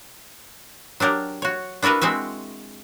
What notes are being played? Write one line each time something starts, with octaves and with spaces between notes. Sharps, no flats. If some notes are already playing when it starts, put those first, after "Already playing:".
F#3 D4 G4 A#4
F#4 C#5
D4 E4 F#4 A#4 B4
G#3 C4 F#4 E5